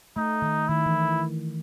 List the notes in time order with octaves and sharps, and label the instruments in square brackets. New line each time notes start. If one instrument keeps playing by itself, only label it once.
[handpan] A3 [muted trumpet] D#4
[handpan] D#3
[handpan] D#3 [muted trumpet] E4
[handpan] E3